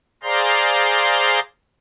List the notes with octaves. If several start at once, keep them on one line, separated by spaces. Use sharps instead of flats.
G#4 C5 D5 F5 A#5 C6